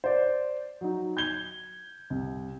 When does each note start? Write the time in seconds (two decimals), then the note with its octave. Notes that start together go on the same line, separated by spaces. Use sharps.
0.04 C5 D5
0.81 F#3 D#4
1.17 G6 G#6 G7
2.10 C2